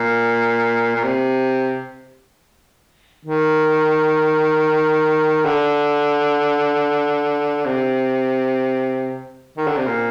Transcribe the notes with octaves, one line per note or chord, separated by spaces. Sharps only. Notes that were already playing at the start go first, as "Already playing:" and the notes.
Already playing: A#2
A#2
C3
D#3
D3
C3
D#3
D3
C3
A#2